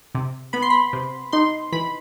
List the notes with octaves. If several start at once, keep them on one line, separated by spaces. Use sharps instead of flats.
C3
B3 B5
C6
B5
C3
D#4 C6
E3 B5